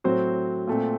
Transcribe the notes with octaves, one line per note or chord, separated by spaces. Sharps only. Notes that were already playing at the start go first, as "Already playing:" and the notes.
A2 F#3 C4 F#4 C5
A#2 A3 C4